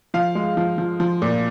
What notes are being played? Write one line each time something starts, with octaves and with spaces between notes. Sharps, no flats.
F3 F5
G#3
F3
F3
F3
A#2